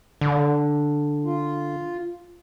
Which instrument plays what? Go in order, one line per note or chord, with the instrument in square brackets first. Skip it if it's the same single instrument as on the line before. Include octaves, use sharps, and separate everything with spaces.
[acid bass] D3
[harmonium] F4